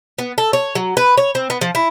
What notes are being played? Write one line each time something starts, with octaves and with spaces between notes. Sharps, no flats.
B3
A4
C#5
F#3
B4
C#5
C4
B3
F3
E4